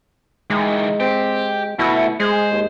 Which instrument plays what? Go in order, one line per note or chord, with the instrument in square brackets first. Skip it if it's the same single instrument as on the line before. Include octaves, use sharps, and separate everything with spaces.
[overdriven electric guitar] D#3 E3 [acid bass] G#3
[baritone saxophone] C4 [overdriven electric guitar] G4
[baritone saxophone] B2 [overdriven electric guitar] A3 F#4 [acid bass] E4
[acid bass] G#3 [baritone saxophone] G#4 [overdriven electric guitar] C5
[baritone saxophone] D#2